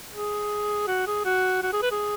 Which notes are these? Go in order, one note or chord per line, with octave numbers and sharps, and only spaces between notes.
G#4
F#4
G#4
F#4
F#4
G#4
B4
G#4